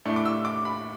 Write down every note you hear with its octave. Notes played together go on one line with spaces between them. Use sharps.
A2 A3 D4
D6
E6
D6
B5